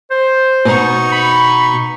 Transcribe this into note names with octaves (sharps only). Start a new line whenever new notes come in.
C5
B2 D#4 C#6
B5